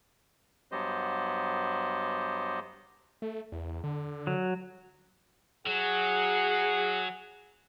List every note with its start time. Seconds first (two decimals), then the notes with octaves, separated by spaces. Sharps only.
0.72 G2 F#3 B3 G4 C5 D#5
3.22 A3
3.52 E2
3.84 D3
4.27 F#3
5.67 F#3 G#4 F#5